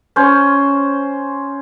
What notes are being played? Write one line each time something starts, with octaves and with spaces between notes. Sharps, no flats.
C#4 C5